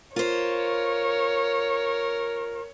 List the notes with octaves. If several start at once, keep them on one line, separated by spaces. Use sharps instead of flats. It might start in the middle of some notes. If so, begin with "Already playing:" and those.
F4 A#4 C5 C#5